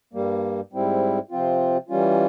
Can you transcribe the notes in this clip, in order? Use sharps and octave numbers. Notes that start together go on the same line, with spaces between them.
G2 G3 A#3
G#2 G3 C4 E4
C3 F3 C4 F4
E3 G3 C#4 F4